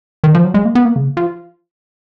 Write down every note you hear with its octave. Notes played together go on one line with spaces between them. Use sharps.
D#3
F3
F#3
G#3
A#3
B3
A#3
C#3
F3